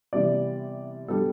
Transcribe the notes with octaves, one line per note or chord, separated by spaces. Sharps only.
C3 E3 G3 B3 D5
D3 G3 B3 A4